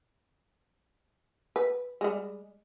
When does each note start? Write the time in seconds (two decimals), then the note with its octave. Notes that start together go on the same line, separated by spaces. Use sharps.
1.56 B4
2.01 G3 G#3